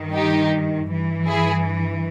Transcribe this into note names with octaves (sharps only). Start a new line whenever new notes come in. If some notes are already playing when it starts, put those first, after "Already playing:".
Already playing: G2 D#3
D#4 G4
G2 E3
E4 G#4